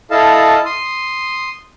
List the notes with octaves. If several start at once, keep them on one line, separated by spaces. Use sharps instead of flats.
E4 A4 D#5 F5 A5
C6 D#6